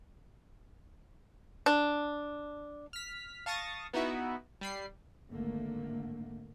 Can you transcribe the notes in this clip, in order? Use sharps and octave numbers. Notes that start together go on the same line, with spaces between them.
D4
F6 B6
F5 A5 C#6 D#6 A6 A#6
B3 D#4 E4 F#4 E5
G3 B5 C7
G#1 D3 A3 A#3